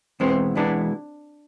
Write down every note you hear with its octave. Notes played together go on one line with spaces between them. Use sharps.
E2 B2 G#3 B3 C4 E4
E2 B2 G#3 B3 D4 E4